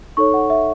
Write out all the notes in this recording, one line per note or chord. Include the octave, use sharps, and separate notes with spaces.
D#4 A4 C#5 C#6
F#5
E5